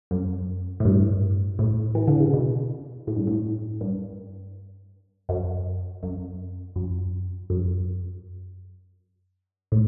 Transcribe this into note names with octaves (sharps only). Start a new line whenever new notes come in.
F#2
A2
G2
A2
E3
D3
C#3
B2
A2
G2
A2
G2
F#2
F#2
F#2
F#2
A2